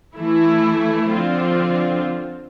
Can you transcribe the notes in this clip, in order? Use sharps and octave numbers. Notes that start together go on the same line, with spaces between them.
E3 A3 E4
D3 F3 C4 F4